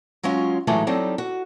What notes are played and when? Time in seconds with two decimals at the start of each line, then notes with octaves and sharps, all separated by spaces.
0.23 F#3 G#3 C#4 F4
0.67 A2 E3 F#3 G#3 A3 D#4
0.87 F#3 G3 C4 D#4 A4
1.18 F#4